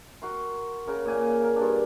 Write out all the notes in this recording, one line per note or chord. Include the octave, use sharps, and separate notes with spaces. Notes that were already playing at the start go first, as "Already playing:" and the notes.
F#4 A#4 C6
C#3 A#4
A#2 G#5
A#4
G2 D4